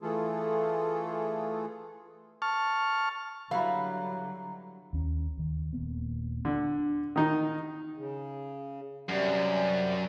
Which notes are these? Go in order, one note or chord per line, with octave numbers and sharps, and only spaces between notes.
E3 A3 F4 G#4 A4
A5 C#6 F6
D3 F#3 G3 E4 F#4 B4 F5 A#5
D#2 C#4
D#2 D#3
D#1 A#3 B3
D3 D4
D#3 D#4
C#3
F#2 C3 G3